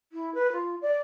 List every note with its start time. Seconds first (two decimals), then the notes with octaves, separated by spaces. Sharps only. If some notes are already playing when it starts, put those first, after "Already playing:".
0.12 E4
0.35 B4
0.53 F4
0.82 D5